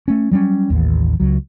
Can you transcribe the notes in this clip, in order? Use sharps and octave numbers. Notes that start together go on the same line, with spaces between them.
A3 C#4
F#3 G3 A#3 C#4
A1 D#2
C#2 F#3